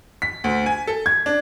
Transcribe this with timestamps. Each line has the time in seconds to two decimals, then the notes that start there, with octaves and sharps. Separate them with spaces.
0.22 B6
0.44 D2
0.66 G#5
0.87 A4
1.06 G#6
1.26 D4